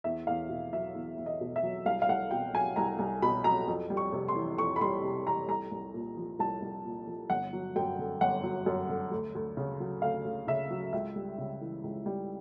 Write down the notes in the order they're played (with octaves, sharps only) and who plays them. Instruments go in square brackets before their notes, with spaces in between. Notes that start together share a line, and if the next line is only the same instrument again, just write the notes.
[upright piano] E2 E5
E2 F5
B2
F#3 E5
E2
E2
D#5
B2
E5
F#3
C2 F5
F5
C2 F#5
B2 G5
F#3 G#5
C2 A#5
C2
B2 B5
F#3 A#5
F2
G3
C#6
C3
C6
E3
F2 C#6
B5
G3 C6
C3
E3 A#5
C2 A#5
C2
A#2
F3
C2 A5
C2
A#2
F3
G1 F#5
F#3
F#2 G5
D3
G1 F#5
F#3
F#2
D3
D2
D2
C#3
F#3
D2 F5
D2
C#3 E5
F#3
C#2 E5
G3
C#3
E3
C#2
G3